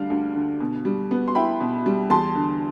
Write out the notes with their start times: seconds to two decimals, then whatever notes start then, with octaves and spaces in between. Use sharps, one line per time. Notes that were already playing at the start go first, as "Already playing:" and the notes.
Already playing: D2 D3 G3 D4 F5
0.10 D2
0.35 D3
0.60 B2
0.85 G3
1.11 B3
1.28 C6
1.35 E4 G5 B5
1.61 B2
1.86 G3
2.10 E2 A5 C6
2.35 D3